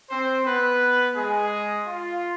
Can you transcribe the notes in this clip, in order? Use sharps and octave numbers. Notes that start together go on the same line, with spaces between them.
C4 C5
B3 B4
G#3 G#4
F4